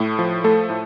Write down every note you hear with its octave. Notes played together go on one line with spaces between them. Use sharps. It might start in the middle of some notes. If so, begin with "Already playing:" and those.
Already playing: A2 A3
F3
A3 A4
A2